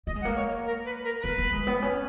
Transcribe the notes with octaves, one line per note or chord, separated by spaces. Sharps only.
A#3 D#5
G#3
F#5
A#3
C#5
A#4
B4
A#4
A#4
B3 B4
B3
G#3
B3
C#4